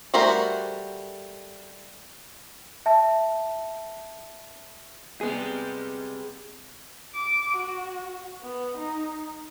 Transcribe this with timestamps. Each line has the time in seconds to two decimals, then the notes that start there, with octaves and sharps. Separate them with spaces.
0.14 G3 A3 F#4 A#4 C5
2.86 E5 A5
5.21 C3 G3 G#3 B3 G#4
7.14 D6
7.56 F#4
8.43 B3
8.77 D#4